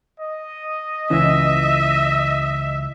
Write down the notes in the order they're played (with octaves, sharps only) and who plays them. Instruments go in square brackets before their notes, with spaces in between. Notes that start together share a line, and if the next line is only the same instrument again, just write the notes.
[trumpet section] D#5
[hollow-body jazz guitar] C#2 E3 C#4 [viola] E5